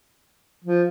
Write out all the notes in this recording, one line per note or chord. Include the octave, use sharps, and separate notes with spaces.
F3